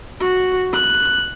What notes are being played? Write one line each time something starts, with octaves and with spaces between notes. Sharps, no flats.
F#4
F#6